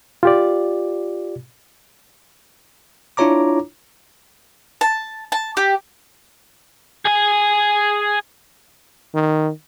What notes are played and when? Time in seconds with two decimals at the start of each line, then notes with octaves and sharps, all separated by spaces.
0.23 F4 G4 D5
3.17 D4 E4 F4 C#5 A#5 D6
4.81 A5
5.32 A5
5.57 G4
7.05 G#4 G#5
9.15 D#3